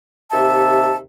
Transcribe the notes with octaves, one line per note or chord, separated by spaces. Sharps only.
D#2 C3 E5 A5